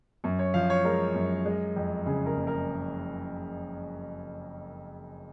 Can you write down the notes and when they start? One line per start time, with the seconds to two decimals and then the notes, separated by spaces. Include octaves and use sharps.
0.24 F#2
0.39 C#5
0.54 F3 F5
0.70 C#5
0.84 G#3 A#4
1.15 F#2
1.46 G#3
1.76 F2
2.06 C#3 G#4
2.26 A#4
2.37 F#1
2.47 A#4